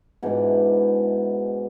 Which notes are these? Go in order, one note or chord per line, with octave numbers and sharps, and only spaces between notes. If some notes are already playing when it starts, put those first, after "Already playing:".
G#2 B2 E3 D4